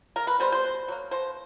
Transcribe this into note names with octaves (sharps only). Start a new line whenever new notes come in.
D#3 A#4
B4
G3 B3 C5
C5
B2
F#3 A#3
B2 C5